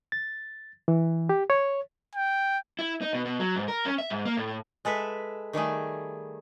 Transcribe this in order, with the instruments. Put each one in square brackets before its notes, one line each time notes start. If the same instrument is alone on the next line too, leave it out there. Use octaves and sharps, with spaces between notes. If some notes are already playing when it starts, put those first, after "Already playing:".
[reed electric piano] A6
E3
G4
C#5
[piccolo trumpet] G5
[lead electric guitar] E4
D#4
B2
B2
F#3
G#2
A#4
C#4
E5
G#2
A#3
A2
[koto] G#3 A4 B4 E5
D#3 G3 A3 G#4